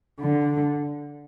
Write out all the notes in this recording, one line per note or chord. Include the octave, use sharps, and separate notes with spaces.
D3